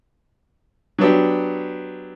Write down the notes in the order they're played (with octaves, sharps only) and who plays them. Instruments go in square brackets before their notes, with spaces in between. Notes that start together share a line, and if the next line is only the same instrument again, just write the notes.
[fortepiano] F#3 B3 D4 G4